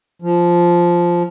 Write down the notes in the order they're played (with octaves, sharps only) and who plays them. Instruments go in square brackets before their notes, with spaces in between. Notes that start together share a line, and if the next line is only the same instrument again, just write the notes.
[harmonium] F3